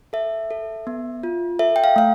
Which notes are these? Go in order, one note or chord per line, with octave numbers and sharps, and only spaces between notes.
A4 E5
A4
B3
F4
A4 E5
G5
F5
A3 F5